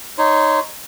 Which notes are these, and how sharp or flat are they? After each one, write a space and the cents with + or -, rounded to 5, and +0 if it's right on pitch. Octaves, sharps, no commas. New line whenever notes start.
D#4 +0 C#5 +0 C6 -25